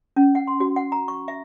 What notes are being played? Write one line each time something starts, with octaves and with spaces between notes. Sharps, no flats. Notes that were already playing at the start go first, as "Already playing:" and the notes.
C#4
F#5
C6
F#4
F#5
A#5
C#6
E5